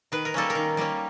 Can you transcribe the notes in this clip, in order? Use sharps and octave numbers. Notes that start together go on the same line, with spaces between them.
D#3 B4
A#4
G3 A#3 C#4 A4
A#4
D#3
G3 A#3 C#4